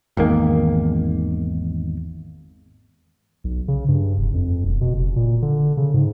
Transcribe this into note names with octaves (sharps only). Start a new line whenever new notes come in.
G#1 E2 D#3 A#3
B1
C#3
G2
F1
F2
E1
B2
F1
A#2
D3
C#3
G#2